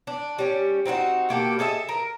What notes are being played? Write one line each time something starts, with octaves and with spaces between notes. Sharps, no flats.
D4
G3 C#4
C4 D#4 F4 F#4
B2 A#3 G4 A4
G#4 A4 D#5 E5
A#4